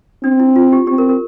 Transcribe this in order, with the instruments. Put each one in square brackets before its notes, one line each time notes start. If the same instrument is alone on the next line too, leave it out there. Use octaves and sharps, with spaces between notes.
[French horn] C4 [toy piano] D4
[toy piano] E4
F4
G4
[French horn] C4 [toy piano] G4
[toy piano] A#4
A#4